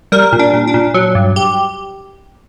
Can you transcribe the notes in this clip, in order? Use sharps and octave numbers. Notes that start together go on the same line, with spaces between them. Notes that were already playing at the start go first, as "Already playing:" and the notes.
G3 A#4
A#2
D4
A#2
D4
A#2
F#3
G2
G4